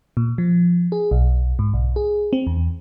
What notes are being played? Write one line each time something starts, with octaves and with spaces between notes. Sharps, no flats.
A#2
F3
G#4
B1
G#2
B1
G#4
C4
E2